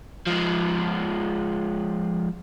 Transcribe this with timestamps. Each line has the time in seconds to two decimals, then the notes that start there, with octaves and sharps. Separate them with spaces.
0.26 F3 G#3